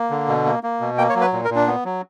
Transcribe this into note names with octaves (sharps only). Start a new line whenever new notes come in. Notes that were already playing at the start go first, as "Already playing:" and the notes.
Already playing: A#3
D3
B2
A#3
A#3
B2
A#3 G5
C#5
F#3
B4
A#2
A#4
A#2
D4
B3
F#3